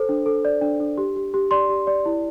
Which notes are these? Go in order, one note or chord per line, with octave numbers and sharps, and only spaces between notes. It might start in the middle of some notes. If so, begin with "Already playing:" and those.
Already playing: A4 C5
D4
A4
D5
D4
D4
G4
G4
G4
D5 C6
G4
D5
E4